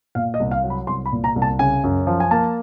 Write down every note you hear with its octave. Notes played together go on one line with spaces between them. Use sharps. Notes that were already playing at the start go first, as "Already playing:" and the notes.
A#2 F5
D#5
C2
F5
F#3
B5
C2 C6
B5
A#2
A#5
C2
A5
C#3 G#5
F#2
F3
G#5
A#3 A5